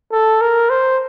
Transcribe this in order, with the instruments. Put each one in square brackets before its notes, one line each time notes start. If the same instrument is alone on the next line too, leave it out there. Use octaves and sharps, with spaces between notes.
[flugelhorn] A4
A#4
C5